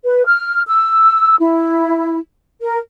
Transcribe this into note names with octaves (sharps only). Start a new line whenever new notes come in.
B4
F6
E6
E4
A#4